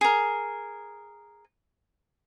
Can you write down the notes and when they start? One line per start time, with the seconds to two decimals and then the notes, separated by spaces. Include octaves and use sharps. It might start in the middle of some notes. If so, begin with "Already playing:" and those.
0.01 G#4 A#4